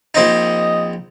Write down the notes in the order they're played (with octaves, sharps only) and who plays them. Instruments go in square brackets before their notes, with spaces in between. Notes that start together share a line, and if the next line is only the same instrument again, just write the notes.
[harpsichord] A#1 C4 D#4 [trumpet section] D#5